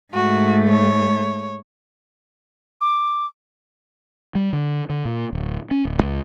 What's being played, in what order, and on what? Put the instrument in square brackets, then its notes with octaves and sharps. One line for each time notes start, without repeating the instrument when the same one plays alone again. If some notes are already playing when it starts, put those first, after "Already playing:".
[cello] G#2 A3 [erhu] F#4
[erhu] C#5
[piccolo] D6
[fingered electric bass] G3
D3
D3
A#2
D1
C#4
D1
C#2